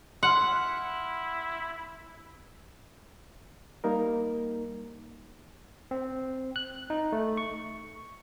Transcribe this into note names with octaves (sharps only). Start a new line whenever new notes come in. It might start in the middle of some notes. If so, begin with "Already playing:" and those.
E4 F#5 C6 F6
G3 A#3 D#4 A#4
C4
F#6
D#4
A3
C#6